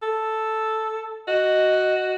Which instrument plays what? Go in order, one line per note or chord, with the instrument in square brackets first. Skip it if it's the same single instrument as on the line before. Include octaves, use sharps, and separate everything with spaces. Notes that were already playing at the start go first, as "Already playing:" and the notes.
[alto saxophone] A4
[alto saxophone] F#4 [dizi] D#5